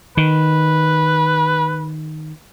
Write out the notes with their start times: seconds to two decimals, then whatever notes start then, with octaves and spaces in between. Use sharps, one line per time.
0.17 D#3 B4